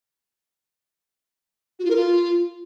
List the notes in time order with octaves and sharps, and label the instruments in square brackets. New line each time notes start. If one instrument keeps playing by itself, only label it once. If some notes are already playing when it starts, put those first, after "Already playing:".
[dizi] F#4
F4
A#4
F4